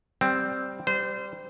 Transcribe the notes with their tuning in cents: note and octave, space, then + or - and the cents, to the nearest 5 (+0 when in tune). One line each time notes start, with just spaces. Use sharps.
G3 +0 C4 +0
G3 +0 C5 -25